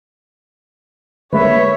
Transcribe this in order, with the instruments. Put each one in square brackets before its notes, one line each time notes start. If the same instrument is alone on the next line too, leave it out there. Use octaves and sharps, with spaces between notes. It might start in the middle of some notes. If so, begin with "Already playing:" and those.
[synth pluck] D3 G#3 A#3 [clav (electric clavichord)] B4 [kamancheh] C#5 [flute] E5